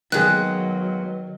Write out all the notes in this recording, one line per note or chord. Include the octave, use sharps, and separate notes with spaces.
D#3 F#3 G#3 A#3 B3 G#4 F#6